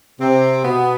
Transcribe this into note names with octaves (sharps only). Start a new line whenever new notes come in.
C3 C4
B2 B3